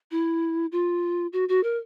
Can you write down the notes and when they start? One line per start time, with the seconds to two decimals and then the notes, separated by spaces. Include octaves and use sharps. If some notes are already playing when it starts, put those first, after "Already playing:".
0.11 E4
0.72 F4
1.33 F#4
1.49 F#4
1.63 A#4